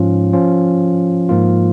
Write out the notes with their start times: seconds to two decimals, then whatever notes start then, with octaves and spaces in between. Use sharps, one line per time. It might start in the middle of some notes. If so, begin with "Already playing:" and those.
Already playing: G#2 F3 C#4 F4
0.33 F3 C#4 F4
1.29 G#2 F3 A#3 F4